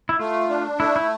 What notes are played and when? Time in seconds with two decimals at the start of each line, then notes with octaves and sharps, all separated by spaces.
0.09 E4
0.19 A3 F4
0.49 D4
0.80 A3 E4
0.96 E4